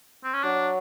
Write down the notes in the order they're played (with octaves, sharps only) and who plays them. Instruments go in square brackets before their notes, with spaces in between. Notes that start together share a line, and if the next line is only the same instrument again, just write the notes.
[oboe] C4
C#4
[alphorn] F#3 [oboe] D4